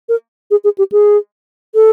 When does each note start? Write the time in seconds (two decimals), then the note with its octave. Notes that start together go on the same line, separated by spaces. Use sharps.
0.09 A#4
0.51 G#4
0.64 G#4
0.78 G4
0.92 G#4
1.75 A4